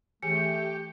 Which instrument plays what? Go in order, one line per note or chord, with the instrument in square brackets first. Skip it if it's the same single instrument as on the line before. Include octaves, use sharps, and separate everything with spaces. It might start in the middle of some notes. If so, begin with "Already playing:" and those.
[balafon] E3 G#4 G#5 [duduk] A3 [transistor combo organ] G4 [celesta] C#7